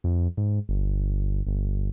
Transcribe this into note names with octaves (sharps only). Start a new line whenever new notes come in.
F2
G#2
G1
G1